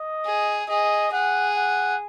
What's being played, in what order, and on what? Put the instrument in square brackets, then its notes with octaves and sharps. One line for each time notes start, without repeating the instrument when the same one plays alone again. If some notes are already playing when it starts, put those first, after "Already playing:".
Already playing: [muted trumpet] D#5
[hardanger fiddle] G#4
[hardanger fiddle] G#4 [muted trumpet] D#5
[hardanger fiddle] G#4 [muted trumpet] F#5
[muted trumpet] F#5